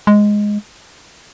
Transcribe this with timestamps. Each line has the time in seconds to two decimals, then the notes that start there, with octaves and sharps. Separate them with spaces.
0.07 G#3